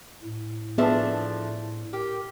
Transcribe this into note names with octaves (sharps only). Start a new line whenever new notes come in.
A2
F3 A3 B3 D4 G#4 E5
G4 A#4